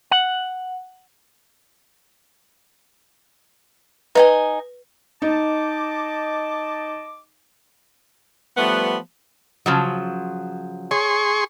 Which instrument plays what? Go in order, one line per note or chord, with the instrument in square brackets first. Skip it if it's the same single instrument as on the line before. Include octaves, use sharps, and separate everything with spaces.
[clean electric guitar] F#5
[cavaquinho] D#4 D#5 G#5 [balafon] B4
[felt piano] D#4 [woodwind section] D#5 A5 D6
[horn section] F3 G3 A3 B3
[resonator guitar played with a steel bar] C#3 F3 F#3
[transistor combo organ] G#4 C6 C#6 [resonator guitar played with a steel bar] C#5